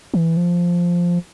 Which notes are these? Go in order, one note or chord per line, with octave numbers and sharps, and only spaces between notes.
E3
F3